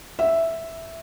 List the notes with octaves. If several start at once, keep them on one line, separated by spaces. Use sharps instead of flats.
E5